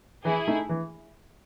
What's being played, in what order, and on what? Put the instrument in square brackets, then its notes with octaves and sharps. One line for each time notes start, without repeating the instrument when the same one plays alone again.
[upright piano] E3 [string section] E4 G#4
[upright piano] A3 D#4
E3